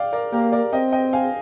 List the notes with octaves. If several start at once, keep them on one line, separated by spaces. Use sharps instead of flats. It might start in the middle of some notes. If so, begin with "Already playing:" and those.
Already playing: D5 F5 G5
A#4 D5
A#3 G4 A#4
A#4 D5
C4 D#5 G5
D#5 G5
F5 G#5